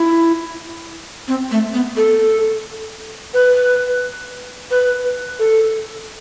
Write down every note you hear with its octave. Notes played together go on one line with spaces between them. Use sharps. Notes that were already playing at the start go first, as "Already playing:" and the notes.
Already playing: E4
C4
A3
B3
A4
B4
B4
A4